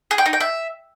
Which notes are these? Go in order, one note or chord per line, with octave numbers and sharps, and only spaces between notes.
G#4
G5
D#4
G5
E5